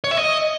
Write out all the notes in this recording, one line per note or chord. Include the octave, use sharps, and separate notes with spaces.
C#5
E5
D#5